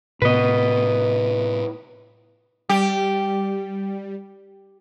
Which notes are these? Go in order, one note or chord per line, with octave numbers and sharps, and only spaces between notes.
A2 C3 B3 B4 D#5
G3 G4